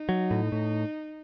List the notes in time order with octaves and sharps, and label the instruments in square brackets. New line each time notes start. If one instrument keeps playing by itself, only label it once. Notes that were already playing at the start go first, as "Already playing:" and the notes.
Already playing: [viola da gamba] D#4
[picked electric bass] F#3
A2
A2